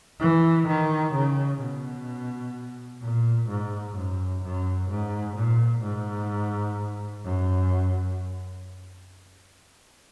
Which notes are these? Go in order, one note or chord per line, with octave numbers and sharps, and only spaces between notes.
E3
D#3
C#3
B2
A#2
G#2
F#2
F#2
G#2
A#2
G#2
F#2